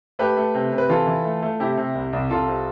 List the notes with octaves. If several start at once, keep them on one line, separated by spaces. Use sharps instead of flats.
A3 G4 B4
A3
C3
C3
B4
E3 F4 A4
E3
A3
A3
C3 E4 G4
C3
C2
C2
C2 F4 A4
C3